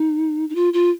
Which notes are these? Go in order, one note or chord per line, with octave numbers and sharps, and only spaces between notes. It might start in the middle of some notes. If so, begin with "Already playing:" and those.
Already playing: D#4
D#4
F4
F4